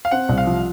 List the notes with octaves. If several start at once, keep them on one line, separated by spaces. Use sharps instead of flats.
F5
C4 F#5
C2
F5
F3